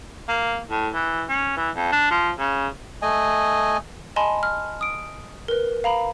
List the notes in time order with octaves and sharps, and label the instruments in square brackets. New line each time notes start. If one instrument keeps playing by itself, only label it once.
[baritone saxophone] A#3
A2
E3
C#4
E3
F2
D4
F3
C#3
[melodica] A3 D#5 G#5
[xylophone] D#5 G#5 A5 B5 C6
F6
D#6 D7
A#4 B4
F5 A#5 B5